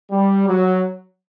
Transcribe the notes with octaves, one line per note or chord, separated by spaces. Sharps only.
G3
F#3